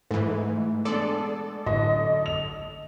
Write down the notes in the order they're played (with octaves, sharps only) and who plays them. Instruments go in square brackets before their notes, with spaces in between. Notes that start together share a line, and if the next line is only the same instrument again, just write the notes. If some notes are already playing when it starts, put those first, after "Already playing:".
[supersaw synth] G#2 E3 [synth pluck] A3
[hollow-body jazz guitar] G#3 B3 D4 [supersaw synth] A4 D5
[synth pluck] A1 [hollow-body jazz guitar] D3 F#3 [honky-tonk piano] D#5
[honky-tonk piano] F7